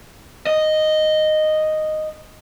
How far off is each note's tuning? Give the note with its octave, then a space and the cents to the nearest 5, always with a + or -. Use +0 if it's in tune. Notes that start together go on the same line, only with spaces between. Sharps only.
D#5 -5